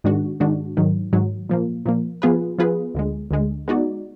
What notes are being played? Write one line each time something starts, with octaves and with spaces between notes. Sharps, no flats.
G#2 D#3 G#3 D4 F#4
G#2 D#3 G#3 D4 F#4
G#2 D#3 F#3
G#2 D#3 F#3
A#2 F3 A#3
A#2 F3 A#3
F3 B3 F4 G#4 B4
F3 B3 F4 G#4 B4
D2 D3 G#3
D2 D3 G#3
G#3 B3 D#4 F#4 D5